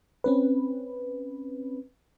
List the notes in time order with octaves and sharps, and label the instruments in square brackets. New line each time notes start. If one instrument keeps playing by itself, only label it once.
[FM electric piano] C4 C#4 B4